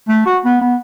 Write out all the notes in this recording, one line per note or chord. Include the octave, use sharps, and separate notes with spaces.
A3
F#4
B3
B3